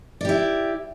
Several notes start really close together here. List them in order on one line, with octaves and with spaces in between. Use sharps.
D5 G4 E4